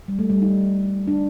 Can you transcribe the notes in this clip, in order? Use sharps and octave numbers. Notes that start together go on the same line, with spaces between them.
G3
A3
G3
D#4
D4